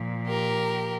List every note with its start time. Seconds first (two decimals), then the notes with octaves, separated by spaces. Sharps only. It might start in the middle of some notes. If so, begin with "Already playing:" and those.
Already playing: A#2 F3
0.28 G4 A#4